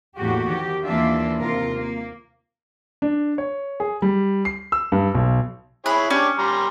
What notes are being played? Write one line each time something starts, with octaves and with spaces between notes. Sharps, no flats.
E2 A2 A#3 F#4 G4
D#3 F3 G4
D#2 E3 A#3 D4 F4 E5
D#2 C3 F4 A#4
A#3
D4
C#5
G#4
G3
C7
E6
G2
B1
E4 G#4 C#5 B5 F#6
C#4 D4 G4 C#5
G3 A#5 C6